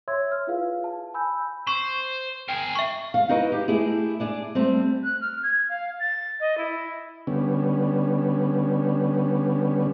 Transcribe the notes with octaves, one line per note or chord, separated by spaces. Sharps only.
C#5 E5 C6 E6 G#6
F6
E4 F4 G#4 B4 F5
A5
G#5 B5 E6 G6
C5 C#6
G#4 A#4 G5
E5 C#6
F5
D#4 E4 F#4 B4 D#5
G4
A3 E4 G4 G#4
D4 G#4 D5
G3 A3 C4
F#6
F6
G#6
F5
A6
D#5
E4
D3 G3 B3 C#4